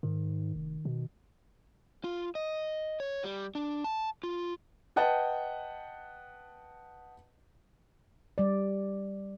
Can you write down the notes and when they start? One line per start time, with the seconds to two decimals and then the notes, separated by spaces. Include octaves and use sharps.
0.03 G#2 D#3
0.55 F1
0.85 B2
2.04 F4
2.35 D#5
3.00 C#5
3.24 G3
3.55 D4
3.84 A5
4.23 F4
4.96 B4 D#5 F#5 G5 A5
8.38 G3 D5